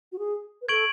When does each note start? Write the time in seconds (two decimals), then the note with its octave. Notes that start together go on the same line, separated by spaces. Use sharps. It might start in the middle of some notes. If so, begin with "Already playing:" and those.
0.12 F#4
0.19 G#4
0.62 B4
0.69 A4 C#6 G#6 D7 F#7